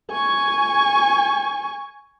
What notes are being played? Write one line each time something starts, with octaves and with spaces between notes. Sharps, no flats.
G#5 C#6